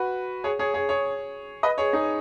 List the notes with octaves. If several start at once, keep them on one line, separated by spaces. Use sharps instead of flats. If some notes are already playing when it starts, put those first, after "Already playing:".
Already playing: F#4 B4
G#4 C#5
G#4 C#5
G#4 C#5
G#4 C#5
B4 D#5
G#4 C#5
D#4 G#4